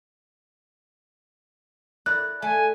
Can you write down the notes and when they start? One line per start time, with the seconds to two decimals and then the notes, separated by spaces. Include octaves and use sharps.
2.06 E4 A#4 D5 F#6
2.42 A3 G#5